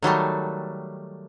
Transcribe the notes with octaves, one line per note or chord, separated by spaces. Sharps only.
D#3 F#3 G3 A3